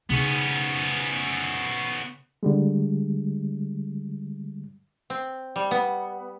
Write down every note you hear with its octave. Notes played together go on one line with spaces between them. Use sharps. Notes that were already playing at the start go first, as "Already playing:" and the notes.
C#3 B3 C#4 D#4
D3 G3 G#3
C4
G3
B3